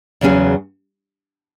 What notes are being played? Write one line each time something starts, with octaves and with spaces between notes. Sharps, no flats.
E2 C#3 F#3 C#4 G#4